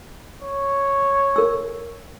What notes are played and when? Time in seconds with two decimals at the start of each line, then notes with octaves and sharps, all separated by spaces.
0.43 C#5
1.36 A#4 E6